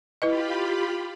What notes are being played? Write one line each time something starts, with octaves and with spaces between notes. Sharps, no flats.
E4 F4 G4 B4 D#5 B5